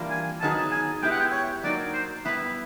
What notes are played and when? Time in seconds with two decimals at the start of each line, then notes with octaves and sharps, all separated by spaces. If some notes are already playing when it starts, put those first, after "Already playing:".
Already playing: E3 G3 A#3 D4 F4
0.10 G#5
0.41 D#3 F#3 B3 D#4 G#4 A5
0.72 G#5
1.02 G#3 B3 E4 G4 G5
1.11 F#5
1.20 G5
1.32 C#5
1.63 F#3 A#3 D#4 F#4 D5
1.94 C5
2.25 G3 B3 E4 B4